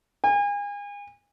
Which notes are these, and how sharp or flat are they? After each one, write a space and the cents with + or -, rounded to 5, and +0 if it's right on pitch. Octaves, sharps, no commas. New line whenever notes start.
G#5 -35